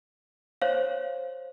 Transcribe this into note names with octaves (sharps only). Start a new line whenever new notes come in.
C5 C#5 F5